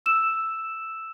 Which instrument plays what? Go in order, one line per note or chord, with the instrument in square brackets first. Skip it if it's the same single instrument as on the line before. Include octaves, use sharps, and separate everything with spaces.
[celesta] E6 E7